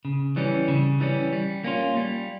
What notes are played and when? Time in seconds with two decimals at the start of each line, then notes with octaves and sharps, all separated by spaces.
0.05 C#3
0.36 E3 G3 C#4
0.68 C#3
1.00 E3 G3 C#4
1.33 G3
1.64 A#3 C#4 F4
1.97 G3